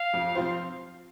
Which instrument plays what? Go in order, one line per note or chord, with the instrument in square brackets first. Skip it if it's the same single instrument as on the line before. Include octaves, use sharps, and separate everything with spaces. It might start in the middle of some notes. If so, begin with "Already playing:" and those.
Already playing: [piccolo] F5
[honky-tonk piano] F2
F3 C4 F4 C5